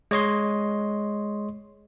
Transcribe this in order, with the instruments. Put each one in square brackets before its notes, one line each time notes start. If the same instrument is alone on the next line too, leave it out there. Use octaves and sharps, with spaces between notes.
[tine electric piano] G#3 C#5 D#5 C6